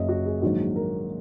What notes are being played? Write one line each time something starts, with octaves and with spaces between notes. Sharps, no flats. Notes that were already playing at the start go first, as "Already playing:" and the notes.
Already playing: F#1 F#2 C#3 F#3 D#5 E5
F#4
G#4
A#1 G#2 D#3 F#3 F#4
A#4